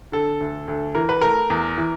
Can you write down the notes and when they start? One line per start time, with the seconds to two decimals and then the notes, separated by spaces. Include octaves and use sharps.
0.12 D3 A4
0.41 D2
0.68 D2
0.95 E3 A#4
1.09 B4
1.21 A3 A#4
1.50 E2
1.78 E3